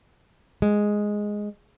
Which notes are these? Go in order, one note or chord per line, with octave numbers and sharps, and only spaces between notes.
G#3